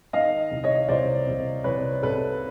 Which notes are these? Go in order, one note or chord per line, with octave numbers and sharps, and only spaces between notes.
D#3 D#5 F5
C2
C#5 D#5
C2 C5 D5
C2
C2 B4 C#5
C3 A4 B4